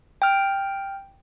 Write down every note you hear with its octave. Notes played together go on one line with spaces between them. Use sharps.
G5 F6